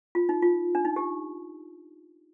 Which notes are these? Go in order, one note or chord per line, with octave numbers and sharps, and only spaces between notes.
F4
D#4
F4
D4
D#4
G4